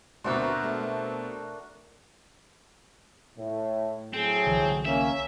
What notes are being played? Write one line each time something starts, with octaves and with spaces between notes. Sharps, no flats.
D2 B2 C4 D4 F#4 A#4 C6
A3
A2
A2 F#3 C4 G#4
C2 D3 E3
A#3 C#4 E5